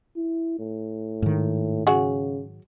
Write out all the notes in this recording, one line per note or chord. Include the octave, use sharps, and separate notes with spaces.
E4
A2
G#2 D#3
C#3 F#3 F#4 G#4